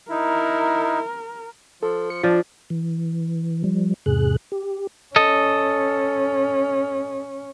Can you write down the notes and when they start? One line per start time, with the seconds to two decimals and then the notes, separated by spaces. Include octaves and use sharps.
0.11 D#4 E4 A#4
1.83 F3 A4
2.10 C#7
2.23 F3 D4 F4
2.70 E3
3.64 F3 G3
4.06 E2 G#2 C3 G#4 F#6
4.52 G4
5.16 C#4 A4 D#5